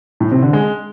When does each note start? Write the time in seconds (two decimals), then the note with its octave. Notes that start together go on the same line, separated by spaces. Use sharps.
0.20 A2
0.31 C3
0.42 D3
0.53 G#3